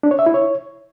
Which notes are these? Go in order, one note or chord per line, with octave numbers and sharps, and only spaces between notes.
D4
C#5
E5
E4
C#5